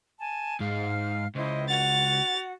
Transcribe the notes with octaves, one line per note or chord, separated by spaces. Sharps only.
G#5 A5
G#2 G#3 F5 F6
C#2 E4 C5 D#5
F#4 F#5 A6 F7